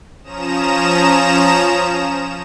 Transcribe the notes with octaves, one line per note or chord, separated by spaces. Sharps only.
F3 C#4 A#5 D#6 E7